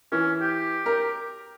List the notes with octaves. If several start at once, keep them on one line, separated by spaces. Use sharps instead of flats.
E3 C#4
G4
A#4